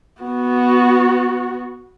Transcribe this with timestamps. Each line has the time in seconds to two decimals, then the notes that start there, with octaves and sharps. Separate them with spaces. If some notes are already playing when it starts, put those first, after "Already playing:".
0.21 B3 F#4